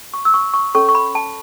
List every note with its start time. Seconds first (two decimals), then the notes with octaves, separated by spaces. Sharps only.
0.14 C#6
0.25 E6
0.34 C#6
0.54 C#6
0.75 C#4 A4 C#5 C#6
0.89 C#6
0.95 B5
1.15 A5